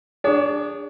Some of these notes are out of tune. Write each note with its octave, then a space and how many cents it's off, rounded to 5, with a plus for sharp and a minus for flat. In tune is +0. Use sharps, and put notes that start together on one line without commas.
D4 +0 G#4 -25 C#5 +35